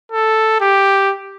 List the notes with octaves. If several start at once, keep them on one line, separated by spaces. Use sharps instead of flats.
A4
G4